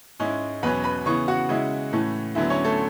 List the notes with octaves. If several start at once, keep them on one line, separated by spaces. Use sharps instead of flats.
G#2 G#3 C#4 E4
E2 B2 F#3 C#4 B4 B5
B4 B5
C#3 E3 B3 C#5 C#6
F#4 F#5
C#3 G#3 C#4 E4
A2 E3 A3 C#4
D2 D3 F#3 B3 E4 E5
C#4 C#5
A3 A4